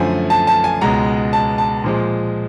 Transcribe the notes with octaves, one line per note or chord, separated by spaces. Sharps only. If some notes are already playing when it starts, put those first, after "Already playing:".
Already playing: F#2 D3 F3 A3 G#5
A5
A5
G#5
C#2 B2 G#3 A#5
A5
A5
A#2 F3 G#3